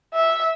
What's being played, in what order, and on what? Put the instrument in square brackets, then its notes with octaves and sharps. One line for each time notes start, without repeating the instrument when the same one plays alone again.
[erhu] E5